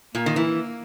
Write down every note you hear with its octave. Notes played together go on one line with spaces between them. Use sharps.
A#2 A#3
D#3
E3